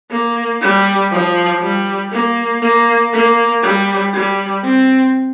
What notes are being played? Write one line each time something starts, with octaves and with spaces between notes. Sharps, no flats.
A#3
G3
F3
G3
A#3
A#3
A#3
G3
G3
C4